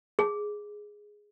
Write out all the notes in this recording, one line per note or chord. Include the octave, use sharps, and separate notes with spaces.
G#4